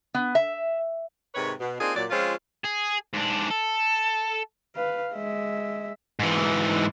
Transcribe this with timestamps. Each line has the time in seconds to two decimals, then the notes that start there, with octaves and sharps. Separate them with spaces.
0.14 B3
0.35 E5
1.35 G#2 C3 D#3 B4 C#5
1.60 B2
1.80 A#3 C4 D4 D#4 F4 G#4
1.95 A#2 F#3 D5
2.11 F3 G#3 C4 C#4 F4
2.65 G#4
3.14 G#2 D4
3.51 A4
4.76 B4 F5
5.14 G#3 E5
6.19 G#2 E3